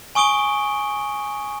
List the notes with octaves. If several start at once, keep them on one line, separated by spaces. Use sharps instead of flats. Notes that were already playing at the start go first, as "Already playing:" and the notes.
G#5 C#6 D#6 D7 G7